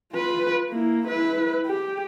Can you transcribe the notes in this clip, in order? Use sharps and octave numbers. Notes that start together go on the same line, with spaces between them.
F4 B4
A#3 E4
E4 B4
G4